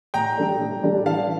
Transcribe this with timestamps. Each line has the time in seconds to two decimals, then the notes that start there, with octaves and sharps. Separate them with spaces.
0.14 A2 G5 A#5
0.37 G3 D4 A4 D5
0.60 A2
0.83 G3 D4 A4 D5
1.06 E3 F5 A5